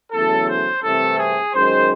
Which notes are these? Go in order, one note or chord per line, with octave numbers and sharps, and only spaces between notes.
E2 C#3 F#3 A3 A4
C5
C2 C3 E3 A3 A4
G#4
F#2 D#3 G#3 C5